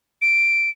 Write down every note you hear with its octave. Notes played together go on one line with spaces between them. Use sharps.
D7